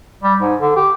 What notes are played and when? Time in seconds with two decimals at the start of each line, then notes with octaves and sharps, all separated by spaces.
0.23 G3
0.41 G#2
0.60 D3
0.76 G4